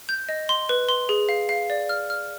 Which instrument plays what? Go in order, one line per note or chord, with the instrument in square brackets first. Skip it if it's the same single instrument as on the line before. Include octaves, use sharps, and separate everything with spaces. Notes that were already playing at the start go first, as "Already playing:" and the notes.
[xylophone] G6
D#5
C6
B4
C6
G#4
F5
F5
D5
F6
F6